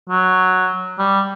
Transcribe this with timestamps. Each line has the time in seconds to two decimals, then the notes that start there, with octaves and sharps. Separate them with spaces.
0.09 F#3
0.99 G3